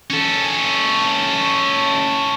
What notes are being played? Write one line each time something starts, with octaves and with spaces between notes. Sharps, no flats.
C#4 A4